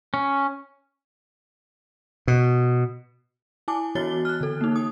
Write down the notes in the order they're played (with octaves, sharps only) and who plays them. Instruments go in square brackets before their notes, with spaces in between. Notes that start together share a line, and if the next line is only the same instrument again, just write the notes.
[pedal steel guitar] C#4
[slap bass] B2
[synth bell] E4 G#5 A5 D6
E3 B3 F#4 C#5 A6 G7
F6 F#6
D3 A4
A#3 D#4
D#6